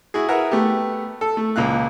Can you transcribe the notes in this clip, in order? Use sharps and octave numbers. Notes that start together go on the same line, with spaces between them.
E4 F#4 G#4
G#4 A#4 B4 E5 F#5
A3 B3 G4
A4
A3
C#2 A#2 F5 F#6